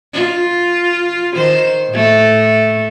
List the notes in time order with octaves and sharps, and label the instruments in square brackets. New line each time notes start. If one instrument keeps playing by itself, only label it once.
[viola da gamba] F4
D#3 C5
A2 A3